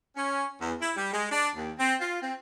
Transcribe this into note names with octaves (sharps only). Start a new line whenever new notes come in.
C#4
E2
E4
G3
G#3
D4
D#2
C4
F4
C4